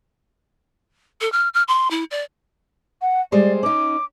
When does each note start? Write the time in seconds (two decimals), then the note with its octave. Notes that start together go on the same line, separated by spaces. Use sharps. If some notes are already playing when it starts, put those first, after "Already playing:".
1.21 A4
1.32 F6
1.54 F6
1.68 C6
1.91 E4
2.11 D5
3.02 F#5
3.32 G3 G#3 C5 D5
3.63 C#4 D#4 D6